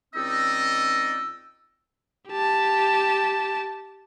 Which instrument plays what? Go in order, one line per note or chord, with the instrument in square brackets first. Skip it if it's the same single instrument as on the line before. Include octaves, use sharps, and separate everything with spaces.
[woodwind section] C#2 C4 E6 [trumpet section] D#4 D5 D#5
[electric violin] G4 A5